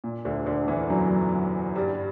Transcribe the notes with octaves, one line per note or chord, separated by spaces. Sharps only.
A#2
D2 D3
D2 D3
E2 E3
F#2 F#3
G2 G3